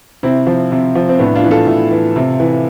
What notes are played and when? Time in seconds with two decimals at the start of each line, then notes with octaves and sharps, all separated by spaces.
0.23 C3 C4 E4
0.47 F3
0.72 C3
0.95 F3
1.09 C4
1.19 A2 B3 D4
1.36 D4 F4
1.44 E3
1.51 F4 A4
1.67 A2
1.91 E3
2.16 C3
2.40 E3